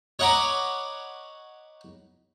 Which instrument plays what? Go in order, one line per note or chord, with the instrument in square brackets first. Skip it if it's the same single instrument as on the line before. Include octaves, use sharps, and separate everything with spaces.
[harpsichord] C#5 D#5 F#5 A#5 B5 D6